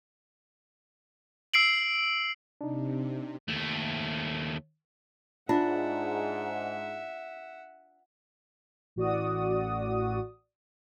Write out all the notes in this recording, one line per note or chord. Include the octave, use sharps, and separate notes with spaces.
E6 C7 D7 F#7
C3 D4 D#4
D#2 A3
G#2 D4 F4 E5 F#5
A1 F#4 D5 D#6